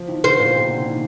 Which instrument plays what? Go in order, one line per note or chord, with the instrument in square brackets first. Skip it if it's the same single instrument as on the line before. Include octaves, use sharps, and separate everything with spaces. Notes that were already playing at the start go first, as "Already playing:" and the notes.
Already playing: [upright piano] F3
D#3
[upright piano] D3 [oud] C5
[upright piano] A#2
C3
D3
D#3